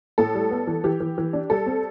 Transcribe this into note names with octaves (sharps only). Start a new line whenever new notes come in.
A2 A4
G3
B3
E3
E3 G4
E3
E3
D4
G3 A4
C4